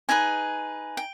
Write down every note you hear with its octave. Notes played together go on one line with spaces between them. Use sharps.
D#4 G#4 B4 G#5
G5